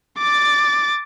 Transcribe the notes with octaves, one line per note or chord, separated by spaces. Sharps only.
D6 A6